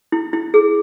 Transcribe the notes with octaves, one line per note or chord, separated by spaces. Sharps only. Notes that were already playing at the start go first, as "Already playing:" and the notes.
E4
E4
G#4